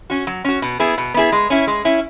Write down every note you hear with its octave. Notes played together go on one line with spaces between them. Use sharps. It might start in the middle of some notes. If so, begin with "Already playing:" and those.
C#4 F#4
F#3
C#4 F#4
B2
B3 E4 G#4
B2
B3 E4 G#4
G#3
C#4 E4
G#3
C#4 E4